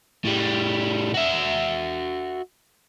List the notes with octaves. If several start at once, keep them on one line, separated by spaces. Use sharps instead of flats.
A2 G3
F#4 E5